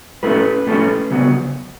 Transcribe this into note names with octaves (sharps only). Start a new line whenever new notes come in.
A2 A3 C#4 B4
A2 A3 C#4
C#3 F#3 B3